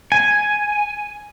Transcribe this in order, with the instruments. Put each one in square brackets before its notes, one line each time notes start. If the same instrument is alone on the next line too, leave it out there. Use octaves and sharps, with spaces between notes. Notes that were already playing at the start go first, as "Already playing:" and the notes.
[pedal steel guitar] G#5